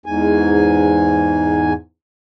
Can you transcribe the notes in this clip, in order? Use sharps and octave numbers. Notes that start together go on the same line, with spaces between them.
E2 G#2 G#5